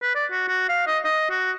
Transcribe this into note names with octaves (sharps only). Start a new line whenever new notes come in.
B4
D5
F#4
F#4
F5
D#5
D#5
F#4